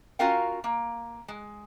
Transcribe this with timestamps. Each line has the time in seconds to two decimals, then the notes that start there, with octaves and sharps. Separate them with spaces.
0.19 C#4 F4 F#4 A#4 F5 G5
0.64 A#3
1.28 G#3